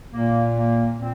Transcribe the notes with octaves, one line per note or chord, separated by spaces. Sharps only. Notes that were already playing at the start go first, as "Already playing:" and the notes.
A#2 A#3
A#3
A#2 C4